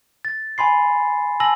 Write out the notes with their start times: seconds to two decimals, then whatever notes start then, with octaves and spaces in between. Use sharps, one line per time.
0.25 A6
0.58 G#5 B5 C6 C7
1.40 G#5 A5 E6 A#6 F#7